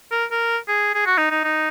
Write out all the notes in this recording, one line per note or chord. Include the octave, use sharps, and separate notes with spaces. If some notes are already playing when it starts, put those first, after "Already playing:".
A#4
A#4
G#4
G#4
F#4
D#4
D#4
D#4